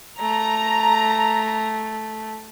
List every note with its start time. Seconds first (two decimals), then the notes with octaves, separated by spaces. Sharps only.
0.20 A3 A#5